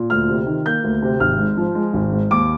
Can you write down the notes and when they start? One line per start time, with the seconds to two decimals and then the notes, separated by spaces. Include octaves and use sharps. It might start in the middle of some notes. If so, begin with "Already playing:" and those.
Already playing: A#2
0.10 D2 F6
0.29 C3
0.47 D#3
0.66 A#3 G6
0.84 D2
1.02 C3
1.20 G#1 F6
1.39 G#2
1.57 F3
1.75 G#3
1.94 G#1
2.12 G#2
2.31 D#2 D6